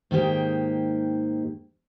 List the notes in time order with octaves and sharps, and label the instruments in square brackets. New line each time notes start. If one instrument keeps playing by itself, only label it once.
[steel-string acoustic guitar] G#2 D#3 A#3 G4 G5